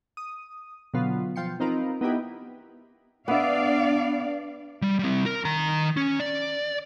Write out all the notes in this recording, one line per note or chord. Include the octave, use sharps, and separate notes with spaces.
D#6
B2 D3 F#3 B3 F4
F3 F5 G5 C6 C#7
C4 D#4 F4 A#4 B4
B3 D#4 E4 G4 B4
B3 D4 D5 E5 F5
G3
G3 C4
A#4
D#3 A#5
C#4
D5